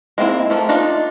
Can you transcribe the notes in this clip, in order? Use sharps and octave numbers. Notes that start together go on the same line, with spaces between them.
G#3 A#3 C4 E4
F3 A3 A#3
D4 D#4 F4 D5